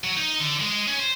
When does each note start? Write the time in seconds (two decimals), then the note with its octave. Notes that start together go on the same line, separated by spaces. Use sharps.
0.04 F#3
0.16 D#4
0.40 D3
0.60 G#3
0.88 C#4
1.00 C5